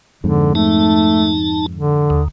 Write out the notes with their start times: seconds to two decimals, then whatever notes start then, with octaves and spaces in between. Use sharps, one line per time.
0.24 F2 G#2 D3
0.55 A3 D#4 A5
1.75 D3
2.10 D#2